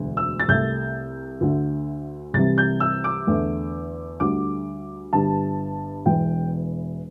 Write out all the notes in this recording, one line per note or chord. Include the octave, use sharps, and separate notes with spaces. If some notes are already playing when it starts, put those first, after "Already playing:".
Already playing: E1 D2 D3
E6
A6
C2 C3 A3 G6
D2 D3 A3
C2 C3 E3 G3 A6
G6
E6
D6
E2 D3 A3
D2 D3 G3 D6
G1 G2 G3 A5
E1 E2 E3 G5